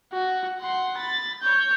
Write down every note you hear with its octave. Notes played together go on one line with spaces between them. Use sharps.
F#4
F#5 C6
B5 A6
C#5 G6